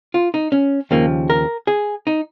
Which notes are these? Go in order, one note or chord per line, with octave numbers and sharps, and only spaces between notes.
F4
D#4
C#4
D#2 C#3 F3 A#3
A#4
G#4
D#4